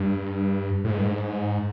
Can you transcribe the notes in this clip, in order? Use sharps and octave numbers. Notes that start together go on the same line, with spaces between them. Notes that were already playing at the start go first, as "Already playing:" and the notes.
Already playing: G2
A2
G#2
G2
G#2